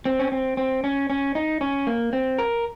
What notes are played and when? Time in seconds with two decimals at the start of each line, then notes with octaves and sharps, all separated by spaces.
0.05 C4
0.19 C#4
0.32 C4
0.57 C4
0.84 C#4
1.10 C#4
1.35 D#4
1.61 C#4
1.87 A#3
2.13 C4
2.38 A#4